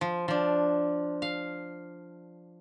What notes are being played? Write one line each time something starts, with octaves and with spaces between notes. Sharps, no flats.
F3
F3 D4
F5